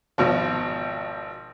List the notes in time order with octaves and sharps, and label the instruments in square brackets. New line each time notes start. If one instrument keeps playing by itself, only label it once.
[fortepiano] G#1 B2 F3